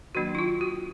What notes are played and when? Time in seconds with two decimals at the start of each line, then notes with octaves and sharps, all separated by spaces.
0.15 D#3 F#3 A#3 D4 F#4
0.35 E4
0.39 F4
0.61 F#4